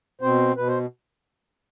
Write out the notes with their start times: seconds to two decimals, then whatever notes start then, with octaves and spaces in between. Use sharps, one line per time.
0.21 B2 C4 C5
0.56 B2 B4
0.68 C5